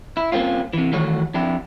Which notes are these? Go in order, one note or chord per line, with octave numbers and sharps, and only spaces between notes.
E4
G3 A#3 C4 C#4 F4
C3 E3
D#3 E3 G3 A3 F#4 C#5
F2 D4 E4 G4